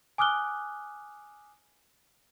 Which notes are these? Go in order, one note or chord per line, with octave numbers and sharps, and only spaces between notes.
G#5 D6 D#6 F6 F#6 G7